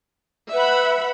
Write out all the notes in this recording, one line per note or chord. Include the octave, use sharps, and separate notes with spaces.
B4 E5 F#5 B5